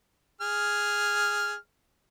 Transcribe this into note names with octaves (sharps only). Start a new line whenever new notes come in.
G#4 F6